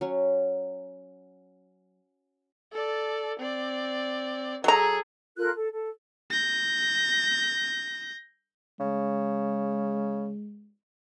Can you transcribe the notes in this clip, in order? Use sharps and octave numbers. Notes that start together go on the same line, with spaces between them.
F#3 C#4
A4 D5
C4 D5
F#3 G#4 A4 A#5
F4 A4 A#4 F#6
A4
A4
G6 A#6
C#3 G#3